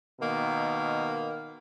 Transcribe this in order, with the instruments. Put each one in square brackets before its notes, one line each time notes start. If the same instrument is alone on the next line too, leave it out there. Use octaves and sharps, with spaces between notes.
[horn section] B2 D#3 A#3